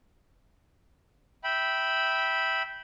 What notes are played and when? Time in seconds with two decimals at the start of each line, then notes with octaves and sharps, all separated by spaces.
1.44 E5 G5 B5